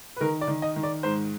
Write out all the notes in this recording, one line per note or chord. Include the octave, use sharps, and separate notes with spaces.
B4
D#3 A#4
D5
D#3
D#5
D#3
D5
G#2 C5